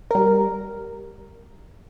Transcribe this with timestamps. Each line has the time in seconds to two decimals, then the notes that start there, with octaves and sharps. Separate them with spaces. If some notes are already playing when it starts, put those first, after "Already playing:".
0.11 G3 A#4